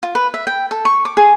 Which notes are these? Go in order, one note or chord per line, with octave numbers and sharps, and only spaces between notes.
F4
B4
E5
G5
A4
C#6
D6
G#4